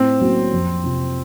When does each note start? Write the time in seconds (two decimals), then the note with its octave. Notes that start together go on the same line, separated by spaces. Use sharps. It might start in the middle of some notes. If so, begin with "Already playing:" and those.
Already playing: A2 C4
0.21 F#3 A#3 C#4
0.52 F2
0.84 C3 F3